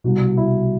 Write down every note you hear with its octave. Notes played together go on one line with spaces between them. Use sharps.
C2 B2 F#4
E4